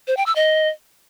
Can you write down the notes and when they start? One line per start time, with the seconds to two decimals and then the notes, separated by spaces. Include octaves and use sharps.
0.08 C5
0.17 G5
0.26 E6
0.36 D#5